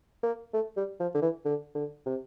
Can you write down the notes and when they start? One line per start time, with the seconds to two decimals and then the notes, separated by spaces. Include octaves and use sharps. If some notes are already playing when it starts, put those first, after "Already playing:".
0.23 A#3
0.54 A3
0.77 G3
1.00 F3
1.15 D3
1.22 E3
1.45 D3
1.75 D3
2.06 C3